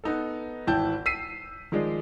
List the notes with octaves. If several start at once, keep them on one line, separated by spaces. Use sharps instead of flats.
B3 D#4 A4
G#1 E3 E4 G5 A5 G6
E6 B6 C7 D#7
D#3 F3 G#3 G#4 D5